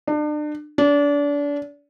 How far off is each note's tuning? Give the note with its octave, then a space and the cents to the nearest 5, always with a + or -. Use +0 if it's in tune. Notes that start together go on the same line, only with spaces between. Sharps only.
D4 +35
D4 -30